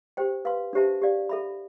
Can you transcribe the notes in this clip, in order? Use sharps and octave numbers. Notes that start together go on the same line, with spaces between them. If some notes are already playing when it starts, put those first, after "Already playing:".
G4 C5 G5
B4 F5 C6
D4 G4 C5 E5 A5
G4 D5 F5
A4 E5 B5